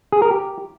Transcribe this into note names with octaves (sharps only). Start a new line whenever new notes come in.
G#4
A#4
G4